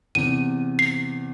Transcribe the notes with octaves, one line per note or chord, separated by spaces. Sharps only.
E2 C3 D#7
C7